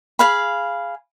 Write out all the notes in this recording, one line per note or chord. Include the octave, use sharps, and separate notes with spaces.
G#4 F5 B5